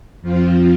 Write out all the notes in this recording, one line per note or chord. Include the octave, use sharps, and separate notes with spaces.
F2 F3 C4 F4